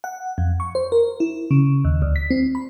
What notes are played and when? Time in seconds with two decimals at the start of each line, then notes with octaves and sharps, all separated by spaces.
0.04 F#5
0.38 F2
0.60 C#6
0.75 C5
0.92 A#4
1.20 E4
1.51 C#3
1.85 D#2
2.02 D2
2.16 B6
2.30 C4
2.55 B5